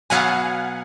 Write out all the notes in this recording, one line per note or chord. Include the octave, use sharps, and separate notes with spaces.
B2 F#3 B3 F5 F#5 G#5